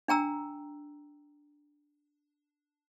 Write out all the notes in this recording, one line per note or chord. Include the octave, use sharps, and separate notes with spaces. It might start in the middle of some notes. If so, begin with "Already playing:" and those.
D4 G5 A#5 E6